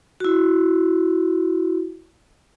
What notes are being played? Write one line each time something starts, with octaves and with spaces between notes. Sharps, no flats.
E4 F#4